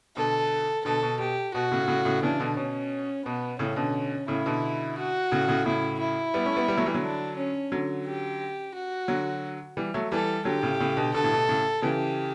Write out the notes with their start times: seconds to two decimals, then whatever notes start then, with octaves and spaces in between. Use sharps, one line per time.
0.16 B2 D3 A4
0.85 B2 D3 A4
1.03 B2
1.19 B2 G4
1.54 B2 F#4
1.72 A2 C#3
1.88 A2 C#3
2.05 A2 C#3
2.23 C#3 E3 D4
2.40 B2 D3
2.57 B2 C#4
3.25 B2 B3
3.59 A2 C#3 C#4
3.76 B2 D3
4.28 A2 C#3 E4
4.46 B2 D3
4.98 F#4
5.32 A2 C#3
5.48 A2 C#3
5.66 A2 C#3 E4
6.00 E4
6.34 G3 B3
6.45 A3 C#4
6.57 G3 B3
6.68 G3 B3
6.77 F#3 A3
6.86 E3 G3
6.94 D3 F#3
7.02 D4
7.37 C#4
7.72 D3 F#3
8.06 G4
8.75 F#4
9.08 D3 F#3
9.77 E3 G3
9.94 F#3 A3
10.12 E3 G3 A4
10.45 D3 F#3 G4
10.63 A2 C#3
10.80 A2 C#3
10.97 B2 D3
11.14 B2 D3 A4
11.24 A2
11.32 B2
11.49 A2 C#3
11.82 C#3 E3 G4